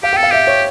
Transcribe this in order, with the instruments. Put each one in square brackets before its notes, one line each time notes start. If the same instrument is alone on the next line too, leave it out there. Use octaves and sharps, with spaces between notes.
[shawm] G4 [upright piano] F5
[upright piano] G5
[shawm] A4
[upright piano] F5
[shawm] G4 [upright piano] E5
[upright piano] C#5